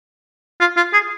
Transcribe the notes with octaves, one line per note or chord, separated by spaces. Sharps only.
F4
F4
G#4